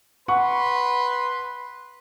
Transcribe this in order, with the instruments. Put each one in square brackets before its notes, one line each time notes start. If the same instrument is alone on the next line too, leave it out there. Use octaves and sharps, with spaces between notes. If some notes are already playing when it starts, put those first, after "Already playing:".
[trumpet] B4 [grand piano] F#5 C#6 [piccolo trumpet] C6